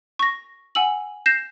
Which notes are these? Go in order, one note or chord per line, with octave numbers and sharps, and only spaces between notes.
C#6 A#6
F#5 G#5 E6 F#7
G6 A#6 C7 E7